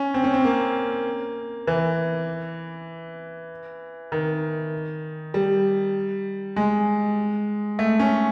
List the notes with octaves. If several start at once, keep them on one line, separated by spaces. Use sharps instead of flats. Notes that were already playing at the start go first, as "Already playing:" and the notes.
Already playing: C#4
C4
C#4
C4
A#3
E3
D#3
G3
G#3
A3
C#4